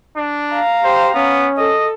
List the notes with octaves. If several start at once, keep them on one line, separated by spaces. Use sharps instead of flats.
D4
F5 A#5
G4 C5
B3 C#4
A4 D#5